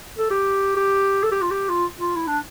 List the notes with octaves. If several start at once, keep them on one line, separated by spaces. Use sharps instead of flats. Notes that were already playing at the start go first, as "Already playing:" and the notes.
A4
G4
G4
A4
G4
F4
G4
F4
F4
E4
D4